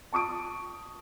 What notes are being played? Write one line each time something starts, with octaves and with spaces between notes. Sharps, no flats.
A5 C#6 D#6 D7